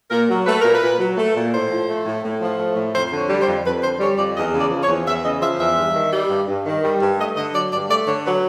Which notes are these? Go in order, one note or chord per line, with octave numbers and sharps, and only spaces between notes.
A#2 A#4
F#3
A3 B4
A#2 A#4
B4
A#2
F#3
A3
A#2
A2 C5
F3
A3
A2
A2
F3
A3
A2
F2 C5
D3
C#5
G3
C5
F2
F2 B4
D3 C5
G3 C#5
F2 D5
E2 D#5
C#3
D5
F3
C#5
E2
E2 E5
C#3 D#5
F3 E5
E2 E5
G2
D#3
G3
G2
G2
D#3
G3
G2
A3 D#5
D3 D#5
F#3 D5
G2 D5
A3 D5
D3 C#5
F#3 B4